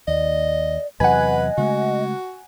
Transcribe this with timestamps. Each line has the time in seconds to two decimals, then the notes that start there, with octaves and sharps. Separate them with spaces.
0.08 D#2 D5 D#5
1.00 E2 C3 F#3 B4 D#5 F#5 G#5
1.58 C#3 G#3 A3 F#4